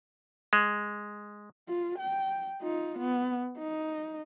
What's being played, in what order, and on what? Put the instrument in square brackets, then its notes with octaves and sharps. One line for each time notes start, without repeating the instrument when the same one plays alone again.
[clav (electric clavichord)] G#3
[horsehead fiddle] F4
G5
D#4 F4
B3
D#4